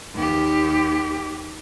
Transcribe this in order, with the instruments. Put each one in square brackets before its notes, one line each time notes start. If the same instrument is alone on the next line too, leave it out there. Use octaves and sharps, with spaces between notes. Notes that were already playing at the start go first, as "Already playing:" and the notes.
[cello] D#2 G4